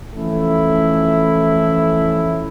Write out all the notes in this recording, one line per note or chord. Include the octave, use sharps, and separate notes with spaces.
E3 F3 A3 C#4 E4